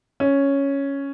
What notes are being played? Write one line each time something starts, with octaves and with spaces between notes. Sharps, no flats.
C#4